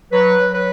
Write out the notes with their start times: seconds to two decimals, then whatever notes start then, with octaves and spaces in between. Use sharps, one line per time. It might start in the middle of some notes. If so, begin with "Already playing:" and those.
0.12 F#3 B4
0.40 F#3
0.53 B4